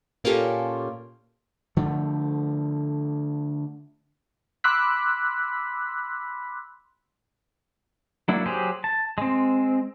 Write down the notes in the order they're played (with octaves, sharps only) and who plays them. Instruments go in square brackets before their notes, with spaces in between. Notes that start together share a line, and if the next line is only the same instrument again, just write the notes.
[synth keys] A#2 A#3 C#4 F4 G4 A4
[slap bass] D3 F3 A3
[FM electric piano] B5 C6 D6 E6 F#6 B6
[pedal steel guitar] F#3 A#3 D4 E4
F#3 G4 G#4 C5
A5
G#3 C4